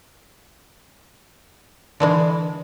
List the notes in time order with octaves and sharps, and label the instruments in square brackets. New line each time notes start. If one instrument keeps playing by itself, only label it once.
[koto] D3 E3 G#3